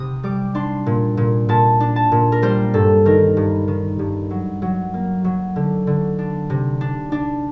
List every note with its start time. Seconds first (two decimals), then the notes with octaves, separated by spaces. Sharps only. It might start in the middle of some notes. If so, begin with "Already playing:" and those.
Already playing: C3 D#6
0.23 G3 D6
0.55 D4 C6
0.86 A#2
1.17 A#2
1.49 A#2 A5
1.80 D4
1.96 A5
2.12 A#2
2.32 A#4
2.42 G3 C5
2.74 G2 A4
3.05 D#3 A#4
3.37 G2
3.68 D#3
3.99 G2
4.30 F#3
4.62 F#3
4.94 A#3
5.24 F#3
5.56 D3
5.87 D3
6.19 D4
6.50 C3
6.81 D4
7.12 D4